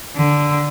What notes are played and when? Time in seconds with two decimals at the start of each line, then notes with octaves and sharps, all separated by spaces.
0.16 D3